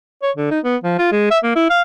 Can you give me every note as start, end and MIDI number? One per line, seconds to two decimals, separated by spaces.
0.23 0.31 73
0.37 0.50 50
0.51 0.60 63
0.64 0.76 59
0.84 0.96 53
0.99 1.08 65
1.12 1.26 56
1.31 1.39 76
1.44 1.54 58
1.56 1.69 64
1.70 1.82 77